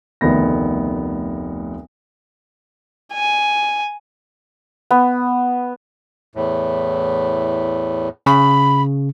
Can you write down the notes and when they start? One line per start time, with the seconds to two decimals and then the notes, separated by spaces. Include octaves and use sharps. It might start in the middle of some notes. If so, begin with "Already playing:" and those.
0.21 F1 D2 D#3 B3 A#6
3.13 G#5
4.91 B3
6.36 E2 A2
8.26 C#3 B5